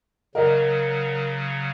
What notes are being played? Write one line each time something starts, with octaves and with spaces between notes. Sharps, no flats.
C#3 F#3 A#4 D5 D#5 F#5